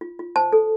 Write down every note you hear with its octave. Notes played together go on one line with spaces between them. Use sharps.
F4
F4
C5 A5
A4